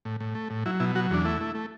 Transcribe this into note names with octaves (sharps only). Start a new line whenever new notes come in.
A2
A2
A3
A2
F#3 E4
B2 E4
F#3 F#4
E2 D4
A3 E4
A3
A3